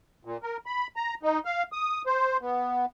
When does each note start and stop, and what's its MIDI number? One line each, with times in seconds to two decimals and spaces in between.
0.25 0.37 46
0.43 0.57 70
0.66 0.87 83
0.96 1.14 82
1.23 1.39 63
1.45 1.63 77
1.72 2.02 87
2.06 2.37 72
2.41 2.85 59